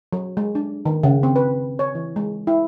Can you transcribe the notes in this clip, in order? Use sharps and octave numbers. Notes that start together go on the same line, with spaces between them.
F#3
G#3
D4
D#3
C#3
C4
B4
C#5
E3
G#3
E4